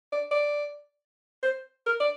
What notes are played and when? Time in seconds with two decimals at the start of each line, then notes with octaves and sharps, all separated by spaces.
0.12 D5
0.31 D5
1.43 C5
1.86 A#4
2.00 D5